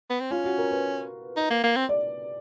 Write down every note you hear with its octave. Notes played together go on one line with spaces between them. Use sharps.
B3
C4
C#4 F4
F#4
A#4
B4
D#4
A#3
A#3
C4
D5